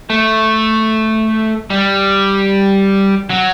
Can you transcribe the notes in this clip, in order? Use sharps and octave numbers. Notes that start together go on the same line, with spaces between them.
A3
G3
F#3